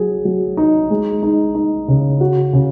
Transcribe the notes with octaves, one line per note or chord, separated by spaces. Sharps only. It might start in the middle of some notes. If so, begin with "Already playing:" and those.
Already playing: F#3 G#4
F#3
D#4
G#3
D#4
D#4
C#3
F#4
C#3